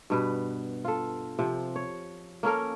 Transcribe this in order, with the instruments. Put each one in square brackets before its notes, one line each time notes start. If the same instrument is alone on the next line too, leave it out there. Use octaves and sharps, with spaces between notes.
[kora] G2 B2 B4
F4 A4
C3 F3
C#5
A#3 C#4 A4 A#4